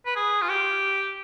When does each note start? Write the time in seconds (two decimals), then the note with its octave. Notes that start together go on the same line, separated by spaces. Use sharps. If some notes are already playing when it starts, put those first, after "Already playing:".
0.06 B4
0.16 G#4
0.42 F4
0.49 G4